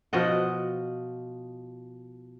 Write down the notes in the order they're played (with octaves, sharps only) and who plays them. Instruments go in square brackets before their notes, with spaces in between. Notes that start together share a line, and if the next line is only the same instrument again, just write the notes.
[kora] B2 F3 D#5 F#5